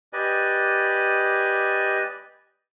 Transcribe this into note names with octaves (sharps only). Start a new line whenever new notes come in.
G4 B4 D5 D#5 G#5